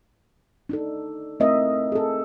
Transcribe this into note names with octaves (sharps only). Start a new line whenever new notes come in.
D4 D#4 A4
A3 C4 E4 A#4 D#5 E5
G#4 A4